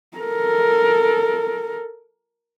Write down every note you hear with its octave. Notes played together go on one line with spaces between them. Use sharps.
A4 A#4